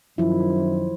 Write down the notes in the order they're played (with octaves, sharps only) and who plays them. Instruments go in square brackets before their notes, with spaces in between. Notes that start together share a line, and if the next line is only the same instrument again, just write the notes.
[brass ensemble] F#2 D#3 [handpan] F3 F#3 E4